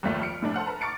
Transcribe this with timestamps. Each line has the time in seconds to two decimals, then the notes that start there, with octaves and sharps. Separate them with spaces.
0.03 G#1 D#2 F3 A3 B6
0.20 F2 F6 C#7 D7
0.41 F1 A2 A3 D4
0.54 A4 C5 F#5 F6
0.66 A4 B4 A5 A#5
0.81 C#6 D6 F6 A6 C#7 D7